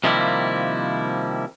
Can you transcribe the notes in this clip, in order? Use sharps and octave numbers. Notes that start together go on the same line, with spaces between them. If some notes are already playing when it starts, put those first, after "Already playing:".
C3 D#3 F3 G3 A#3 E4